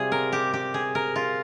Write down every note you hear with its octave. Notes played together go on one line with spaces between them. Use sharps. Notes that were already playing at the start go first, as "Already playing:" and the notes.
Already playing: C3 G3 F4 G#4
A#4
G4
G4
G#4
A#4
F4